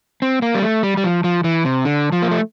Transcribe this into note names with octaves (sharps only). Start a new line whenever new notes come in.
C4
A#3
G3
A3
G3
G3
F3
F3
E3
C3
D3
F3
A#3
A3